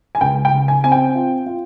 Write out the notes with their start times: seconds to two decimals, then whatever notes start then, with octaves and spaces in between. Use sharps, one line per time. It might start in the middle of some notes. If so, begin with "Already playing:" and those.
0.15 G#5
0.21 C#2 G5
0.45 G5
0.52 C#3
0.68 G#5
0.84 C4 G#5
0.92 G5
1.15 F4
1.46 F4